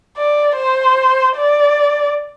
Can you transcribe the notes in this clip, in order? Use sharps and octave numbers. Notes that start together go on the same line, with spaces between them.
D5
C5
D5